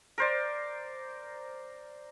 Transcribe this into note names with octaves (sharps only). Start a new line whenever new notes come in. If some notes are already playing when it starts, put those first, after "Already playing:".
A#4 C5 D5